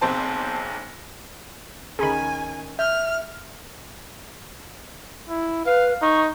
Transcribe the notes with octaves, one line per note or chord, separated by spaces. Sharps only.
F#1 B1 C4 C5 A5
D2 D#3 C#4 G#4 G#5 A#5 B5
E5 F6 G6
E4
B4 F5
D#4 C#6